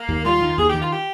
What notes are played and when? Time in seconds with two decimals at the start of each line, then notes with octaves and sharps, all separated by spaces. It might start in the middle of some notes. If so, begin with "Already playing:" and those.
Already playing: A#3
0.09 D#2
0.25 G3 F4
0.41 D#3
0.58 D#2 G#4
0.69 D#3 G4
0.81 F4
0.92 G4